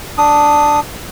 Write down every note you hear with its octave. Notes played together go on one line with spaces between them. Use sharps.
D4 D#6